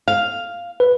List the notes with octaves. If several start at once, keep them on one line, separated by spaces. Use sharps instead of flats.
F5
B4